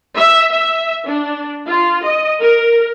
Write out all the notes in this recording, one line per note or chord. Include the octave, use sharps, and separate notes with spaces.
E5
E5
D4
F4
D#5
A#4